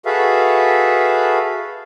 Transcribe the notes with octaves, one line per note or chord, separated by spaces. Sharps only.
F#4 G#4 A4 B4 E5 F5